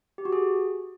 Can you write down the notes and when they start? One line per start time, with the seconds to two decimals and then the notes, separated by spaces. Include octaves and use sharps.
0.18 G4
0.25 F#4
0.32 G#4